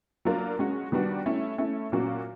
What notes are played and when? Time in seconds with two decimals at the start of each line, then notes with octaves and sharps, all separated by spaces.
0.25 F#3 A#3 D4 F4 A#4
0.59 G#3 C#4 F#4
0.92 D#3 G3 B3 D4 F#4
1.26 A3 C#4 E4
1.58 A3 C#4 E4
1.92 A#2 F#3 A#3 C#4 F#4